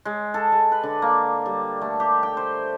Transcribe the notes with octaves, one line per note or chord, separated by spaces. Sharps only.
G#3
A4
G#3
B4
D3
A#3
G3
A3
G4
G5
C5